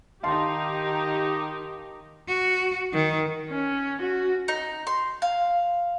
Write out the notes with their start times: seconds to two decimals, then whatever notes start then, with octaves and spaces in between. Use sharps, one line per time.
0.23 D#3 D#4 G4 F5 A5 C6
2.28 F#4
2.93 D#3
3.49 C#4
4.01 F#4
4.48 D#4
4.87 C6
5.22 F5